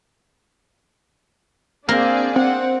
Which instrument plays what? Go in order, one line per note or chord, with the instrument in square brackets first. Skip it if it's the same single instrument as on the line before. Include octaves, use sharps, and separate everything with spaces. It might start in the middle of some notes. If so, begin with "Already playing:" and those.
[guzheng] A#3 A#4 [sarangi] C4 [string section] D4 G#4 D5
[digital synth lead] C4 [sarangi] F#5